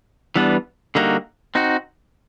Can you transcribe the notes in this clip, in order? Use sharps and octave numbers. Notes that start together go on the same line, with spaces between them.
E3 G3 B3 D4
D3 G3 A#3 D#4 F#4
C4 D#4 F#4